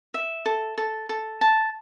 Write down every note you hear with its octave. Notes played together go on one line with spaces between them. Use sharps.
E5
A4
A4
A4
A5